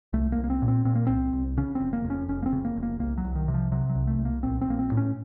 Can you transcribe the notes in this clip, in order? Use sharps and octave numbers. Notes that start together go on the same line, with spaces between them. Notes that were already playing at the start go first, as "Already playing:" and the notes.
C2 A3
A#3
C2
A#3
C4
A#2
C4
A#2 C4
A#3
C2 C4
C2
C#3 C#4
C4
F1
A#3
F2
C#4
F1 C#4
A#3
C4
C#3
A#3
F1
A#3
C2 A#3
F#3
C2
D#3
C3
F3
C3 F#3
F#3
C2
A3
C2
A#3
A#1 C4
C4
A#1 A#3
C4
A2
C#4